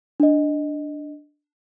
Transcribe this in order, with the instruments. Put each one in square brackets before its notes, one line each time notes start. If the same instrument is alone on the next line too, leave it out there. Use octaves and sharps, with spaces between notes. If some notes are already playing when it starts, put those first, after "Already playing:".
[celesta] D4 D#5